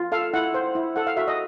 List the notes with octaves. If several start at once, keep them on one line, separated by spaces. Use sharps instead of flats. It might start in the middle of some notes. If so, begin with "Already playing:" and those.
Already playing: F4
A4 F5
E4 F#5
C5
E4
A4 F#5
F5
F#4 E5
D#5